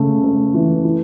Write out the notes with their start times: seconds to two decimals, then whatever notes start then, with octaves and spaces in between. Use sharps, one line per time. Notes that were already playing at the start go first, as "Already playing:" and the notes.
Already playing: C#3 A3
0.24 A3
0.54 E3
0.84 E4